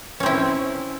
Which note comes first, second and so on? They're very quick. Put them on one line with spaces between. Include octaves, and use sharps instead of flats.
C#4 C4 E4